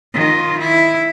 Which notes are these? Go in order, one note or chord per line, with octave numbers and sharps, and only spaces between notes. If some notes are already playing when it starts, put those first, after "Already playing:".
D#3 F4
E4